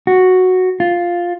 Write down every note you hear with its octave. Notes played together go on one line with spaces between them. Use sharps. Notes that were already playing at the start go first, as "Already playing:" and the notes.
F#4
F4